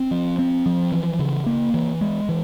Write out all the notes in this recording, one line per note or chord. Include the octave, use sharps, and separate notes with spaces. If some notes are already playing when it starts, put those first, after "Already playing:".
Already playing: C4
F3
C4
F3
E3
C#3
A#3
E3
G#3
E3